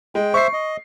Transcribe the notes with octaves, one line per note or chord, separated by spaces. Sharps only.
G#3 G5
C5 E5 C#6 C7
D#5